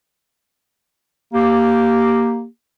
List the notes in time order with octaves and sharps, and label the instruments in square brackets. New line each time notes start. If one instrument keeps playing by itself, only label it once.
[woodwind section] A#3 G4